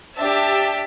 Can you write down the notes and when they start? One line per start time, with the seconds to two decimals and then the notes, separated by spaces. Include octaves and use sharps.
0.17 D4 G4 E5 A5